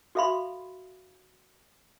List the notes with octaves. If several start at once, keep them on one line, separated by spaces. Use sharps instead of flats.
F#4 A4 E5 F5 B5 C6